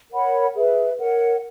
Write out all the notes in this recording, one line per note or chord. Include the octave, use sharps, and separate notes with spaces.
A#4 C#5 F#5 B5
G#4 B4 E5
A#4 C#5 F#5